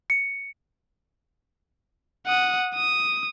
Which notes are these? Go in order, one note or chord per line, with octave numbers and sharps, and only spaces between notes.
C#7
F#5 D#6
D#6